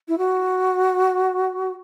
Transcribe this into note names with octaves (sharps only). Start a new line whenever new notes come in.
E4
F#4